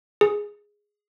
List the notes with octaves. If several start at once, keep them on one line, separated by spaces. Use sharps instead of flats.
G#4